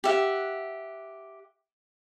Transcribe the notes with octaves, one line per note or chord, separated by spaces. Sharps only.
G4 E5 F#5